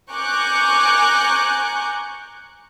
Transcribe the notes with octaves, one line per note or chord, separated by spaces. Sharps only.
G#5 A#5 C#6 D6 F#6 G6